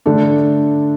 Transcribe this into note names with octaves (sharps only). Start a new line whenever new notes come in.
D3 A3 D4